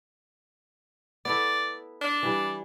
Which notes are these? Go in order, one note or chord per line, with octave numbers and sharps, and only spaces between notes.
B3 E4 A4 D5
D4
E3 G3